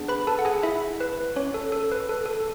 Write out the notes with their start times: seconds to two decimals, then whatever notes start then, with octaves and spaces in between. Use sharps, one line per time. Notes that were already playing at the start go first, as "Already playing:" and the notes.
Already playing: B3 D4 G#4
0.08 B4 B5
0.27 A4 A5
0.39 F#5
0.45 G#4 G#5
0.63 E4 E5
1.00 B4
1.36 C#4 C#5
1.54 A4
1.72 A4
1.92 B4
2.09 A4
2.26 A4